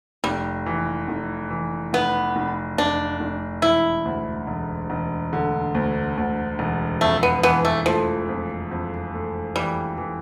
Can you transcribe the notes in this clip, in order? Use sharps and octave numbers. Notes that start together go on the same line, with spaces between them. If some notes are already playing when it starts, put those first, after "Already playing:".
F1 G3
E3
F1
E3
F1 B3
F1
F1 D4
F1
E1 E4
D2
E1
E1
D3
D2
D2
E1
F2 A3
B3
E3 B3
A3
F3 A3
F2
F2
A3
E3 G3
E3